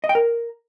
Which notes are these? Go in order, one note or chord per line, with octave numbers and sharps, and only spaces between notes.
D#5
G5
A#4